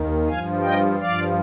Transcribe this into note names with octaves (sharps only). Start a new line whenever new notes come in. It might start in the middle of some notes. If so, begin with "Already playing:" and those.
Already playing: D#2 D#3
G2 F3 F5 G#5
D#5 G5
G2 F3 D5 F5